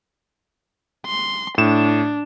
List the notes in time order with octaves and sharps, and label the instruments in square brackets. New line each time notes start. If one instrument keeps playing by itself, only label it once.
[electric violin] C6
[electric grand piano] A2 E7 [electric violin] D4